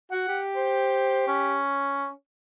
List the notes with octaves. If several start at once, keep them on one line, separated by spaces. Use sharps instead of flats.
F#4 F#5
G4
C5
C#4